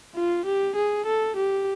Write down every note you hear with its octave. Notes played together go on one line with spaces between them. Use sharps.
F4
G4
G#4
A4
G4